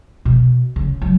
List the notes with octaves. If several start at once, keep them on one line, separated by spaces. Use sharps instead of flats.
B2
C#3
F#3